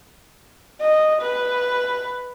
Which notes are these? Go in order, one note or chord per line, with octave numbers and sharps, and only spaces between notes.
D#5
B4